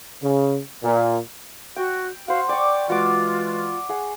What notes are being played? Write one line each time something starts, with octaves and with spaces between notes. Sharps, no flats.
C#3
A#2
F#4 G5
F#4 C5 F5 F#5
D5 G5 C#6 D6
E3 G#3 F4 F#4 D6
G#4 F#5